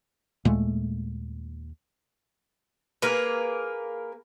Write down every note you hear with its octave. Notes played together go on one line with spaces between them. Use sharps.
D#2 A#2 G#3 A3
A#3 G#4 A#4 B4